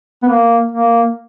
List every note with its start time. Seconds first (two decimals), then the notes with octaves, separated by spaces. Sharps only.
0.23 B3
0.29 A#3
0.72 A#3